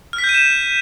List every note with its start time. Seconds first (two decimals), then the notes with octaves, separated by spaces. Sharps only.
0.13 F6
0.18 B6
0.24 G6
0.29 D#7
0.34 E7